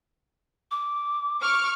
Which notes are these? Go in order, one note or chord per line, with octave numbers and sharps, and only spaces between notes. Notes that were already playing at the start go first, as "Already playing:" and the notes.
D6
C#6 D6 F6